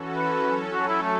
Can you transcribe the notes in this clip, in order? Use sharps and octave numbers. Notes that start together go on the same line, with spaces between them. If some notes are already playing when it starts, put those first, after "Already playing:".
Already playing: E3 C#4 F#4 A4
B4
F#3 C#4 A4
F#4
E4
A3